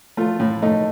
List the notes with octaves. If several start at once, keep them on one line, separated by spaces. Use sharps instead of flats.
A3 F4
A2
A3 D#4